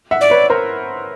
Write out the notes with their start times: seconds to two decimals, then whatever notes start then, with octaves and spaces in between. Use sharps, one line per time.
0.11 E5 F#5
0.21 D5
0.30 B4 C#5
0.50 A#4 C5